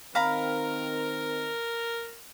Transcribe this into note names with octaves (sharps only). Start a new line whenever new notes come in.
D#3 C4 A#4 F5 A#5 B5